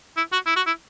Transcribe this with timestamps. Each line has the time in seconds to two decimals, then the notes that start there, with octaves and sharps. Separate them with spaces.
0.17 E4
0.33 F#4
0.46 E4
0.56 F#4
0.66 E4